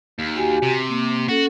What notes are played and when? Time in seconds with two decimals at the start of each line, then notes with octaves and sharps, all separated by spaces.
0.19 D#2
0.35 F#4 G4 G#5
0.63 C3
0.90 A#3
1.29 C#4 F#4 A4